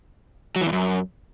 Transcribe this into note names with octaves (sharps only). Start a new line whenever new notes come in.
F#3
E3
E2
F#2